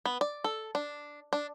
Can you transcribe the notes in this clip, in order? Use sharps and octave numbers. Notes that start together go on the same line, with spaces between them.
B3
D5
A4
D4
D4